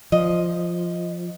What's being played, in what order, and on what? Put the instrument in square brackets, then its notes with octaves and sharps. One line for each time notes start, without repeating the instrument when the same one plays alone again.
[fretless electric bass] F3 [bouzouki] D#5